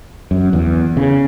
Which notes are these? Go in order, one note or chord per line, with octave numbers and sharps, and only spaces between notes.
F#2
E2
C#3